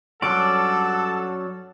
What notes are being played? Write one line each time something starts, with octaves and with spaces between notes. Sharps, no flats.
G2 F#3 C#4 A4 D5 F#5 A5 D6